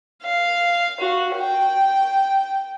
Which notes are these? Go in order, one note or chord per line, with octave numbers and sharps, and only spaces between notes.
F5
F#4
G5